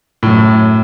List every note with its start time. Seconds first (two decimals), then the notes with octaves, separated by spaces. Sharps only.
0.23 F#2 A2